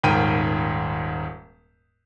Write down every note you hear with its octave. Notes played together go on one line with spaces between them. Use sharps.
D#1 G#2 A#4 G5 D#7